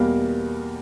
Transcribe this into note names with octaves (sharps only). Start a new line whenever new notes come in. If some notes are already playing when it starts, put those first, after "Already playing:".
Already playing: E2 B2 G3 A#3